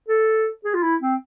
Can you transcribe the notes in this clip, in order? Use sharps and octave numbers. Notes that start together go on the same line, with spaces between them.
A4
G#4
F4
E4
C4